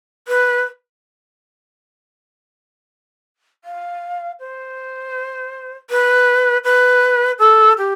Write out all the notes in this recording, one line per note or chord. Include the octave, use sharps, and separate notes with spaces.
B4
F5
C5
B4
B4
A4
G4